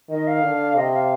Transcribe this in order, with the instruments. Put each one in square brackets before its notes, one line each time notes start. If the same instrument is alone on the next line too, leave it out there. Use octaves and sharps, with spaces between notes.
[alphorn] D#3 [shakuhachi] D#5
[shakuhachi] F5
[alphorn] D3
[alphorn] C3 [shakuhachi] D#5
[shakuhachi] F5